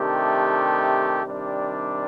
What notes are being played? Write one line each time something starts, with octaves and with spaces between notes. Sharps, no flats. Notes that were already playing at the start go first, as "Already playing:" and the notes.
Already playing: C3 D#3 A3 D4 G4
C3 D#3 G3 D4